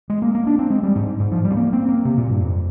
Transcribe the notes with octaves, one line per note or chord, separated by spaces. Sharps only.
G#3
A#3
A#3
D4
C4
G#3
G3
G#2
G#2
F3
G3
C4
A#3
C4
A#3
C3
A#2
G2
F2